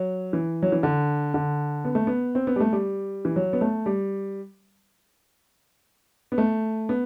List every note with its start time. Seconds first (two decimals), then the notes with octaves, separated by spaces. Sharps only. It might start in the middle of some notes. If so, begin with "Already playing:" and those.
Already playing: F#3
0.33 E3
0.62 F#3
0.72 E3
0.83 D3
1.34 D3
1.85 B3
1.95 A3
2.07 B3
2.35 C4
2.47 B3
2.56 G3
2.60 A3
2.73 G3
3.25 E3
3.36 F#3
3.53 B3
3.61 A3
3.86 G3
6.32 B3
6.38 A3
6.89 B3